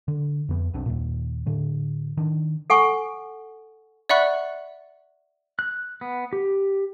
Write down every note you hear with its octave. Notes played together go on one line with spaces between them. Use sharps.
D3
F2 B3
B1 B3 C4 D4
D#2 A#2
A2 D3
D#3 D4
A4 F#5 G#5 C#6
D5 E5 F#5 B5 C#6 F#6
F#6
B3
G4